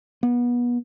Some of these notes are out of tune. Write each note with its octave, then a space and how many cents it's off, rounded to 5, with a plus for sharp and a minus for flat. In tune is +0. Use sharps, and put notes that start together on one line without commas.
B3 -30